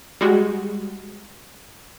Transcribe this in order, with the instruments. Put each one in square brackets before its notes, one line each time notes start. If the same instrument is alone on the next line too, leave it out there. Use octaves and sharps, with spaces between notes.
[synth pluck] G3 G#3 F#4